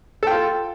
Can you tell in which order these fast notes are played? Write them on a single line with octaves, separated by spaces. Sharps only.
A4 G5 F4